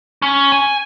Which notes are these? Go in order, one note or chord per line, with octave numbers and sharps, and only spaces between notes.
C#4
G#5